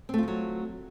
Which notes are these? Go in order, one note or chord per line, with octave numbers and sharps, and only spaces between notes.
F3 F#3 A3 C4 F4